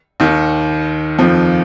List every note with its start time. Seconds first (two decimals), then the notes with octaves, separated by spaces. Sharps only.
0.20 D#2 D#3
1.18 F2 F3